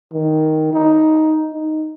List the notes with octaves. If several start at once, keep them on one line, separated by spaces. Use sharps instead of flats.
D#3
D#4
D#4